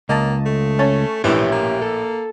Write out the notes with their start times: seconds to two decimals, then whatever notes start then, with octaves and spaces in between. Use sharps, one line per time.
0.09 C#2 A#3 D#5 A5
0.46 A3
0.79 C#4 C#5 A5
1.24 A#1 A2 E3 G4 C#5 E5
1.52 A#3
1.82 A4